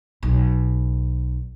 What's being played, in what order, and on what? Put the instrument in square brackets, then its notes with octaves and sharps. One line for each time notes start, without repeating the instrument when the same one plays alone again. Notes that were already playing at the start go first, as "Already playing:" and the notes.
[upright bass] B1